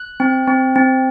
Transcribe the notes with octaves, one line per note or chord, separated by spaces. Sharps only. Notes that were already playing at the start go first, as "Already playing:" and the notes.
Already playing: F#6
C4
C4
C4